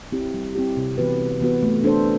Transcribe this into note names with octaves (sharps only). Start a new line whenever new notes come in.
C4 E4 G4
G3
C4 E4 G4
C3
E3 B3 F#4 B4
C3
E3 B3 F#4 B4
A3
D4 A4 C5